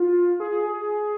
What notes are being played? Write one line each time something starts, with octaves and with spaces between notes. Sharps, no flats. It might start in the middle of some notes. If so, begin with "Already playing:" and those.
Already playing: F4
G#4
G#4